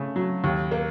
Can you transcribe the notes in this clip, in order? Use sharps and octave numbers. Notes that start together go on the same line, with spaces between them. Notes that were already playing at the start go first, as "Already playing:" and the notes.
Already playing: C#3 A3
F#3
D#2
A#3